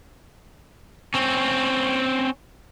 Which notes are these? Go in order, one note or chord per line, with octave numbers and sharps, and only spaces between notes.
C4 C#4